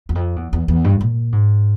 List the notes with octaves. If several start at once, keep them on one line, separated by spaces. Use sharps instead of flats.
E2
F2
E2
E2
E2
G2
A#2
G#2